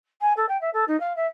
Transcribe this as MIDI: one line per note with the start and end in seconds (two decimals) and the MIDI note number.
0.21 0.33 80
0.37 0.46 69
0.49 0.59 79
0.61 0.70 76
0.73 0.84 69
0.88 0.99 63
1.00 1.16 77
1.16 1.26 76